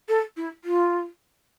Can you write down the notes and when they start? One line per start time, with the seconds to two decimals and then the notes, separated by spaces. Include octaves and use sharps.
0.09 A4
0.37 E4
0.64 F4